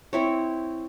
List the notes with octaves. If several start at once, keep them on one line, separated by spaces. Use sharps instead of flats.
C4 E4 C#5